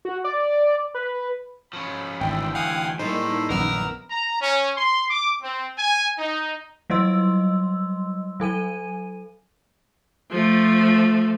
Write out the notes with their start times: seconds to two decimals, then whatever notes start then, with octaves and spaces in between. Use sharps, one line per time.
0.05 F#4
0.24 D5
0.94 B4
1.73 F3 C#4 B5
2.21 G#1 D2 E3 G5
2.55 F5 F#5 G#5 D#6
2.99 A2 G3 G#3 A#3 D#4 C5
3.50 A#1 F#2 D#3 B3 A#4 E6
4.10 A#5
4.41 C#4
4.76 C6
5.10 D6
5.42 C4
5.78 G#5
6.18 D#4
6.90 F#3 G3 D#5 C6 E6
8.40 F#3 A4 G#5 D#7
10.31 F3 A3